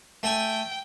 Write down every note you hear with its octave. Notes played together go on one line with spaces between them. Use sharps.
A3 G5 G#5